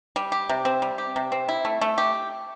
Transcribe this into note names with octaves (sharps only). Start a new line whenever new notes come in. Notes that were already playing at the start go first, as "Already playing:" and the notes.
G3
G4
C3
C4
G3
G4
C3
C4
E4
A3
A3
G4